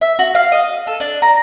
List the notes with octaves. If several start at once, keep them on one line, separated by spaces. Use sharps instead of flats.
E5
F#4
F5
D#5
A4
D4
A#5